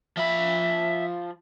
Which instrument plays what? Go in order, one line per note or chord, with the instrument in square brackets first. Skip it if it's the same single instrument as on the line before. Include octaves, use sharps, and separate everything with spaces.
[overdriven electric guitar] F3 B5 [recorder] E5